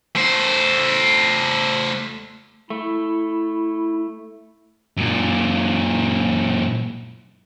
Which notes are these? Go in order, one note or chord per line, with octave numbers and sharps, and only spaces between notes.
A3 C5
A3 E4
F#2 A#2